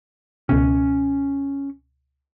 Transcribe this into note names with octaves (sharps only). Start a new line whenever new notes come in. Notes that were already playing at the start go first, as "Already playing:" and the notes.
C#2 B2 C#4